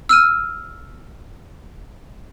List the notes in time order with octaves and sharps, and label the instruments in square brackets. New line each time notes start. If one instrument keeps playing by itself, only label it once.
[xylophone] E6 F6 D#7